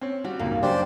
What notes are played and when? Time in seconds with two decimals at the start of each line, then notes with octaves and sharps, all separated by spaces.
0.01 C4 C#4
0.24 G3 F#4
0.39 F#1 C#2 G#2 A#3
0.63 F#2 D4 G4 C5 D5